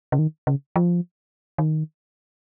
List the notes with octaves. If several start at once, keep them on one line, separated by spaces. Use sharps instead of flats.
C#3
D#3
C#3
F3
D#3